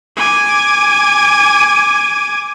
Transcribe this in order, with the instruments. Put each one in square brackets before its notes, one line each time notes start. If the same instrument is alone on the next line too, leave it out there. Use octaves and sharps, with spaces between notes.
[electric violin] G#5 D6